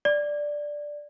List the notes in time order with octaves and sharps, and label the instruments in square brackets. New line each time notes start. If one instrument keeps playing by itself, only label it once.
[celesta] D5